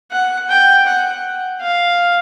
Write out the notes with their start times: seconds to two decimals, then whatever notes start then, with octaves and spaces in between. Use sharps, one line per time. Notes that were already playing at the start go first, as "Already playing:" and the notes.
0.11 F#5
0.50 G5
0.86 F#5
1.61 F5